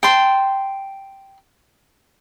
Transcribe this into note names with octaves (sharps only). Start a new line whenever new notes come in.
G5 A5 C6